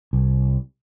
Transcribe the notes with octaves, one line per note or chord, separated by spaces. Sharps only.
C2